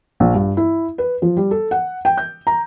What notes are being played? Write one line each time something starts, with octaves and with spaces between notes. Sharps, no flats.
A#1
G2
E4
B4
F3
G3
A4
F#5
G5
G6
A#5